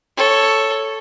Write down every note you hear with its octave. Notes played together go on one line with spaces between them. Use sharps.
A4 C#5